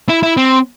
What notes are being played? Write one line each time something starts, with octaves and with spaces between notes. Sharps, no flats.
E4
E4
C4